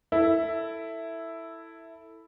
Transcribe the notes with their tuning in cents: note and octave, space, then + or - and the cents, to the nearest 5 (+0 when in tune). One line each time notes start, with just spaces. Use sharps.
E4 +0 A4 +15